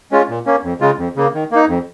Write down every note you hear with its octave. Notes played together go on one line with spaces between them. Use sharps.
G#3 C#4 F4
A#2
A#3 C#4
F2
C#3 G#3 F4
F2
C#3 A#3
D#3
A#3 D#4
F2